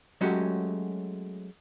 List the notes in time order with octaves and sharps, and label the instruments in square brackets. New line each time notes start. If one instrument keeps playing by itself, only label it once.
[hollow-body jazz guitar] F#3 G#3 A3 C#4 F#4 G4